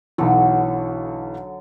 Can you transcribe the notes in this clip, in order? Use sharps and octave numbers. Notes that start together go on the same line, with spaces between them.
B1 D3 E3 F#3